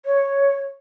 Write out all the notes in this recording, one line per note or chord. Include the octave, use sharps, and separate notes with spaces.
C#5